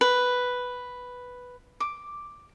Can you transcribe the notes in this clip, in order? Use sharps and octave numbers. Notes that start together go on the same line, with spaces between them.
B4
D6